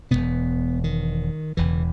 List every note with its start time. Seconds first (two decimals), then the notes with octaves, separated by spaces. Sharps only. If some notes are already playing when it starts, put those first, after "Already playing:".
0.11 E1 E2 B2 G#3 B3
0.84 D#3
1.57 E1 E2 C#3 E3